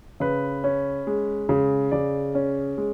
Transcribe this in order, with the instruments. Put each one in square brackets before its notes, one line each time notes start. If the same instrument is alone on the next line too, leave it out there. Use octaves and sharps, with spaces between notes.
[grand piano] C#3 B4
C#4
G#3
C#3
C#3 D5
C#4
G#3